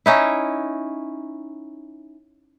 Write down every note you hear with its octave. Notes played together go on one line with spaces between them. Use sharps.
C#4 D#4 E4